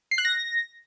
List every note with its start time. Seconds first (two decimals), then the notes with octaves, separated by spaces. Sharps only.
0.11 C7
0.18 F#6
0.25 A#6